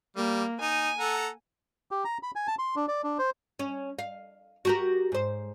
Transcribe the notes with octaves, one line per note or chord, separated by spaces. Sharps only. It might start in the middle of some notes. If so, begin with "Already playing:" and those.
G3 A#3
D#4 G#5
A4 F#5 A#5
G4
A#5
B5
G#5
A5
C6
D4
D5
D4
C5
C#4
F5
F#4 G4 A#4
G#2 C5